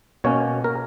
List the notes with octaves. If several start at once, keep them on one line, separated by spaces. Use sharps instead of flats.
B2 A#3 C#4 C#5
A#4